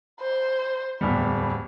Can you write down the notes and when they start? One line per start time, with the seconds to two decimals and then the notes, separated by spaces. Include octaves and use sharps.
0.21 C5
1.01 D1 E2 G3 B5